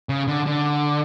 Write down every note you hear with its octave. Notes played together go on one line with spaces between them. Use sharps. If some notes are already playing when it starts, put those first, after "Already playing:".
C#3
D3
D3